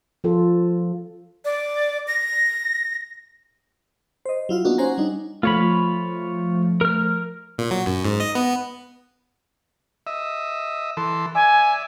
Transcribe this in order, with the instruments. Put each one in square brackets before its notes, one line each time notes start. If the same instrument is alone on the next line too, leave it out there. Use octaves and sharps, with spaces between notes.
[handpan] F3 F4 A4
[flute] D5
A#6
[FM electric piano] C5 D#5
F#3 E4 F4 F5
A#3 B3 D4 D#4 F#4
C#4 C5 F#5 G#5 A#5
G3 D4 D#4
[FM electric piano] F3 A3 [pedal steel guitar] F4 C#5 B5
[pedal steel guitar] A#4 F6
[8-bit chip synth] A#2
F#3
F#2
G#2
D#5
B3
[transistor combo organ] D#5 E5
E3 A4 C6
[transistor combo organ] D5 E5 [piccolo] G#5